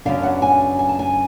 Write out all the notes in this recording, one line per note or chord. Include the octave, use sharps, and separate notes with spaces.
F#2 C#3 F#3 B3 D4 F5
F#5
G#5
G#5
A5
G#5